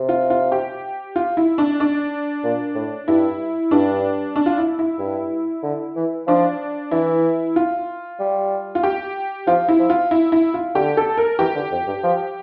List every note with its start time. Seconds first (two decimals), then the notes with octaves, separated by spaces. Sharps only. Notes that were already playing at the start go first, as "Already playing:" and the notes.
Already playing: C3
0.09 F4
0.30 F4
0.52 G4
1.16 F4
1.37 E4
1.58 D4
1.80 D4
2.44 A#2
2.75 A2
3.08 G2 E4
3.71 G2 D4
4.36 D4
4.46 F4
4.58 E4
4.79 E4
4.99 G2
5.63 D3
5.96 E3
6.27 F3 D4
6.91 E3 E4
7.56 F4
8.20 G3
8.75 F4
8.83 G4
9.47 F3 F4
9.68 E4
9.79 F3
9.90 F4
10.11 E4
10.32 E4
10.54 F4
10.75 D3 G4
10.97 A4
11.17 A#4
11.39 E3 G4
11.55 D3
11.71 F2
11.88 G2
12.04 F3